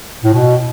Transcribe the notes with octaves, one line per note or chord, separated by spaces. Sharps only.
A2
B2